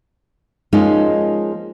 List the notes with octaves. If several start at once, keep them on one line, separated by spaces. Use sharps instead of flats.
F3 G#3 A#3 C#4 D#4 F4